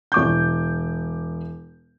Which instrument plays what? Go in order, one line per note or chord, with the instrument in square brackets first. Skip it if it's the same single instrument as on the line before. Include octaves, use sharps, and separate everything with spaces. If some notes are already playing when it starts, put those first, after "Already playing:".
[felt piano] E1 D6 G6